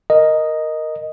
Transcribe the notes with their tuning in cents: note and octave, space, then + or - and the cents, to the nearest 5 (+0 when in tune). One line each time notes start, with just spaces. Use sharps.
A#4 +0 D#5 +0